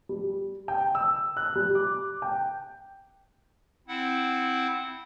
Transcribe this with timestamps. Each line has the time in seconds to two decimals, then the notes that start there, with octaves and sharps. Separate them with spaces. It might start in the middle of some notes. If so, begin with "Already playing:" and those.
0.09 G3
0.68 G5
0.95 E6
1.37 F#6
1.56 G3
1.75 D6
2.22 G5
3.88 C4 E4 F#5